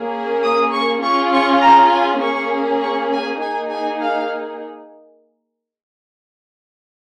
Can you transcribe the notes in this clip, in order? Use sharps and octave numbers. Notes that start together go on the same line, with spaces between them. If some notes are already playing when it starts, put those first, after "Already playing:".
Already playing: A#3 C#4 G#4
D#6
C#6
C#4 F4 G#4 C#6
C#6
A#5
G#5
A#3 C#4 G#4 C#6
C#6
G#5
A#3 D#4 G#4 G#5
G#5
F5